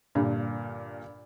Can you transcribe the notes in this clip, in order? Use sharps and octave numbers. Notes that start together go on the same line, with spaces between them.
G2 A#2 D3